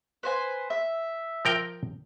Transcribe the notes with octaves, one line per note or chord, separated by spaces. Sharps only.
B4 C5 G#5
E5
F3 A#4 G5